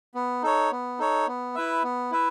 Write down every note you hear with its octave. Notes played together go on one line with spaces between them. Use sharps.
B3
D#4 A4 C#5
B3
D#4 A4 C#5
B3
E4 B4 E5
B3
E4 B4 E5